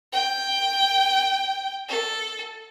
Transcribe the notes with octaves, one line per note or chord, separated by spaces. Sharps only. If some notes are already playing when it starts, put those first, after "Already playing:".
G5
A4